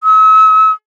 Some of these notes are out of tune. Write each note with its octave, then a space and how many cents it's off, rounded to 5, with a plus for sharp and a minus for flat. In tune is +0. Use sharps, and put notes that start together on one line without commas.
E6 -45